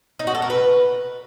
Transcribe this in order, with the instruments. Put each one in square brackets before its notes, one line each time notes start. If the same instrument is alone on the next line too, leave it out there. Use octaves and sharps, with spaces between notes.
[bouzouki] D#4
F#4
A4
A#4
B4